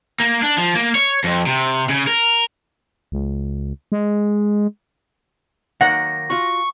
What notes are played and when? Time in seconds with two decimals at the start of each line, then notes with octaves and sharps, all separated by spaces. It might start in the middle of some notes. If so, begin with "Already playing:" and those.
0.20 A#3
0.43 D4
0.58 F3
0.75 A#3
0.95 C#5
1.24 F2
1.47 C3
1.89 C#3
2.07 A#4
3.12 C#2
3.92 G#3
5.81 D#3 F#3 A#3 F#5 A#6
6.30 F4 F#4 C#6